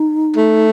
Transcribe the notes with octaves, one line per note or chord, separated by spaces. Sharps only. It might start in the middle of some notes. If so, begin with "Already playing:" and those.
Already playing: D#4
A3